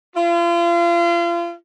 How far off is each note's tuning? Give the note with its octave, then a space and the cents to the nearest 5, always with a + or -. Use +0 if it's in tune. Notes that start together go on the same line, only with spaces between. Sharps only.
F4 -35